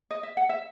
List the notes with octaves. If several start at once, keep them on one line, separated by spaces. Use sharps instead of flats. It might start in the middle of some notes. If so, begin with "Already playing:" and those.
D#5
E5
F#5
E5